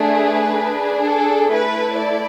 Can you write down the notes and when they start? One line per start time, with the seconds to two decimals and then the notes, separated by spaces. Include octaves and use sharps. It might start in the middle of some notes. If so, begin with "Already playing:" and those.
Already playing: A3 D4 G#4
0.11 B4
0.58 D4 G#4
1.04 A4
1.51 A3 E4 A4 B4
1.97 D5